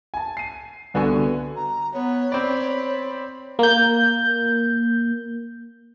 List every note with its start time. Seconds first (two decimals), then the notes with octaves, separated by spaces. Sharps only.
0.14 G#5 A5
0.37 C7 D#7
0.94 C2 D3 B3 F#4 G#5 C#6
1.56 A#5
1.94 B3 C#5
2.32 C4 D5 B5
3.59 A#3 G6